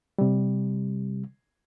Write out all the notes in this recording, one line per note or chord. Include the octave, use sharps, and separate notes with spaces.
C3 G3